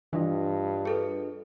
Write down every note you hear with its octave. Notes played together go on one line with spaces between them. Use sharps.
G2 E3 D4 F4 D#5
G#4 A4 B4